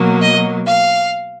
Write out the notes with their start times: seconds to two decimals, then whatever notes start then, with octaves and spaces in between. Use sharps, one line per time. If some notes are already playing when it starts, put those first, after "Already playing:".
Already playing: B2 F#3 A#3
0.21 D#5
0.66 F5